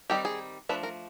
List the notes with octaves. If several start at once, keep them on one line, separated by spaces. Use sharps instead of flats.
D#3 G3 C4 D#4 G4
G#4
F3 A3 D4 B4
A#4